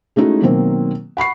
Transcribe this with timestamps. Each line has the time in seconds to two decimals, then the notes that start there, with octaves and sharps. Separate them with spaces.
0.16 G#3 A3 C#4 D#4 E4 F#4
0.42 B2 D#3 F#3 A#3 C4
1.17 F#5 B5 C#6 C7